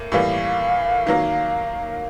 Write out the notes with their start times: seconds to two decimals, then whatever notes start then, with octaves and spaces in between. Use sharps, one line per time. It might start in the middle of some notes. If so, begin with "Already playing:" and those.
Already playing: A2 A#3
0.12 A2 E3 G3 A#3 F5
1.07 D#3 F#3 A#3